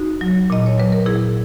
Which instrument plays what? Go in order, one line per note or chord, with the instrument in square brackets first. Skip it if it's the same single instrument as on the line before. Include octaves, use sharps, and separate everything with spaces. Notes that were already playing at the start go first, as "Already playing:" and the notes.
Already playing: [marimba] D#4 F#4
F#3
A#2 D#5
C#5
F#3 B4
A#4
A#2 E4 G#4